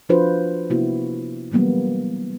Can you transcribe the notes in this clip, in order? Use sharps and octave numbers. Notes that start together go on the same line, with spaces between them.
F3 D4 F4 F#4 B4 C5
C3 A#3 B3 E4 F#4
E3 F#3 G3 A#3 B3